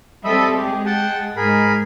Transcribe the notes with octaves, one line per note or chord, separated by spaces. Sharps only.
G3 C4 A4 D#5 E5 B5
G#3 G4 G#4
F#5 G5 A5
G#2 G#3 G#4 A#4 B5